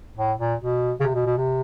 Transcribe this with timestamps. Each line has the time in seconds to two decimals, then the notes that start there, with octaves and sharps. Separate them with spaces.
0.17 A2
0.39 A#2
0.61 B2
1.00 C#3
1.04 C3
1.14 B2
1.26 B2
1.37 C3